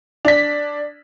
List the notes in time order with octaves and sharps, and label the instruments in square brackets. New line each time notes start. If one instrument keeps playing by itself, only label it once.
[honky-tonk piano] D4 B6